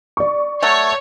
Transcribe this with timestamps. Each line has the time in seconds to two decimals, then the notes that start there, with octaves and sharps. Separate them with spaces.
0.17 D5 C#6
0.63 F#3 A3 C#5